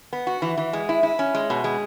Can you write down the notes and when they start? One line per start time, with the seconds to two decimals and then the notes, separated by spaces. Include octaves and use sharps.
0.13 B3
0.27 F#4
0.42 E3
0.58 E3
0.73 G#3
0.89 E4
1.03 E4
1.19 C#4
1.35 G#3
1.50 B2
1.64 G#3